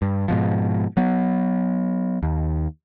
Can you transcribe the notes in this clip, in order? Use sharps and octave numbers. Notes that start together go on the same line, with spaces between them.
G2
G#2 B2 F3
F#3 B3
D#2